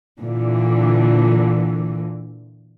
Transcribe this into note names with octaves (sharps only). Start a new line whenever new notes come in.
A#2 D3 E3